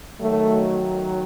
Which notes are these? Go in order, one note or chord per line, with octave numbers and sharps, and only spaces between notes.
D#3 F#3 A3